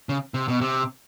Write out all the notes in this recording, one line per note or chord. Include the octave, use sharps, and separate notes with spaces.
C#3
C3
B2
C3